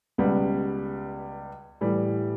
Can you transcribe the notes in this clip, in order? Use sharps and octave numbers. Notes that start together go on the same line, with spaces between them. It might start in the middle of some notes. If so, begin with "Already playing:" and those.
C#2 B2 G3 B3
A2 E3 G3